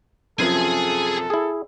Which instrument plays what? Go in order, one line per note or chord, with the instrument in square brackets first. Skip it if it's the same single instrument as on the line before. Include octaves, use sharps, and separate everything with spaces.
[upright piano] F#2 C3 F3 [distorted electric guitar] G#4 G#5 [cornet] A4
[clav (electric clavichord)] E4 G#4